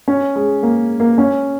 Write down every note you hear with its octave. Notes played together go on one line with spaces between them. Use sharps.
C#4
G#3
A#3
A#3
C#4